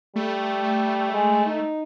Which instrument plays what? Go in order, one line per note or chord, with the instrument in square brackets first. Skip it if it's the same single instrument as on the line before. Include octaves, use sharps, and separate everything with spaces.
[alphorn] G3 [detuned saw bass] A3
[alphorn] G#3
D#4